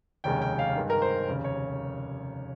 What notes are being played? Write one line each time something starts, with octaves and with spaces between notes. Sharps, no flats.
F1 D#2 C#3 G#3 C#4 G5
G5
F5
G2 D#3 G#3
A#4
C5
F1 D#2 C#3
C#5